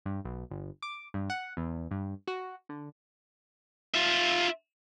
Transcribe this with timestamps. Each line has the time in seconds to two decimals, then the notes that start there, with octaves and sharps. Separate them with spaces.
0.06 G2
0.25 B1
0.51 G1
0.83 D6
1.14 G2
1.30 F#5
1.57 E2
1.91 G2
2.28 F#4
2.69 D3
3.95 F4 E5